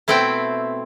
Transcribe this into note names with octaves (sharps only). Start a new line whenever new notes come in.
B2 A3 C4 E4 G5